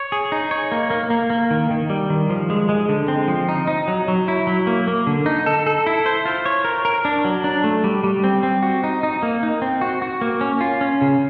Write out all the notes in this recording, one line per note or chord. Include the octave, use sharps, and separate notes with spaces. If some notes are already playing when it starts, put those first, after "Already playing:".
Already playing: C#5
G#4
D#4
C#5
A#3
A#3
A#3
A#3
D#3
D#3
G3
D#3
F3
G#3
G#3
D3
C4
F3
D#4
D#4
F#3
F#3
E4
F#3
A#3
A#3
D3
D#4
A4
A4
E4
C5
F4
C#5
A#4
A#4
D4
F#3
D4
A3
G3
G3
C4
C4
F#4
D#4
D#4
A#3
D#4
C4
F#4
F#4
A#3
C#4
F4
C#4
C#3